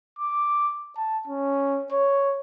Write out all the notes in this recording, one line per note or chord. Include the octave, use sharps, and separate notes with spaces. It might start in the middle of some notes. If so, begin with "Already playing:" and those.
D6
A5
C#4
C#5